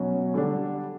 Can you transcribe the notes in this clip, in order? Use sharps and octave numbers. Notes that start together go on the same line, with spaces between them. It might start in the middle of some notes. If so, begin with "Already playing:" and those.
Already playing: B2 F#3 C#4 F#4
D3 G3 D4